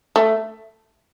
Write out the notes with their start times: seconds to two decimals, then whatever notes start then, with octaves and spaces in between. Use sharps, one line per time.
0.16 A3